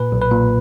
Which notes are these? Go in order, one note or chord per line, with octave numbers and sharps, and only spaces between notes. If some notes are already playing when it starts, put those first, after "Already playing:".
Already playing: A#2 B4
B1
B4
A#2